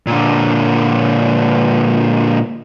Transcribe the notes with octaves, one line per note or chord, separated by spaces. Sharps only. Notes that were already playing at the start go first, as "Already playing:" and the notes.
A#2 D3